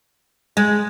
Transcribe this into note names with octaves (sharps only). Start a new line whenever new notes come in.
G#3